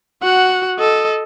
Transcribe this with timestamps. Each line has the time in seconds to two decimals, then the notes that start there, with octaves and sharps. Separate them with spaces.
0.22 F#4 F#5
0.79 A4 D#5